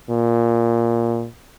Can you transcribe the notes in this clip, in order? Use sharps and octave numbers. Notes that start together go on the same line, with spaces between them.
A#2